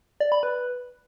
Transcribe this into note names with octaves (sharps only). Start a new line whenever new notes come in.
D5
B5
B4